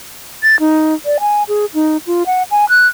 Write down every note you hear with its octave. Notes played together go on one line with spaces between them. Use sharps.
A6
D#4
D5
G#5
G#4
D#4
F4
F#5
G#5
F#6